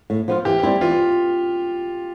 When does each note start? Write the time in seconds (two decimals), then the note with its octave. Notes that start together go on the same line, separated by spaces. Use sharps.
0.10 A2
0.28 F3 B3 F4
0.45 E3 G4
0.63 G3 C4 E4
0.81 E3 F4